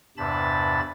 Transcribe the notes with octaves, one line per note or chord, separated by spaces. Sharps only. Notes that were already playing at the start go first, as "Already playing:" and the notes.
E2 G2 C3 A5 B5 A6